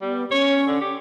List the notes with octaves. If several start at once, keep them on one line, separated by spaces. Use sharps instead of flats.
G3 B3
C#4 C#5
D3
G4